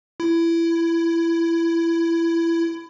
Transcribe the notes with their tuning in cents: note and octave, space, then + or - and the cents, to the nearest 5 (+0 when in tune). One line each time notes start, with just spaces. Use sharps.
E4 +20